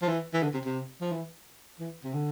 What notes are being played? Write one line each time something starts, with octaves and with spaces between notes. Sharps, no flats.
F3
E3
E3
D3
C3
C3
F3
E3
E3
C3
D3